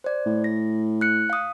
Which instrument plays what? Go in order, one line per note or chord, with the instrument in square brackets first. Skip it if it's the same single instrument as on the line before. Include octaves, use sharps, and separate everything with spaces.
[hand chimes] C5 D5
[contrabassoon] A2
[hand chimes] A#6
F#6 C#7
F5 D#6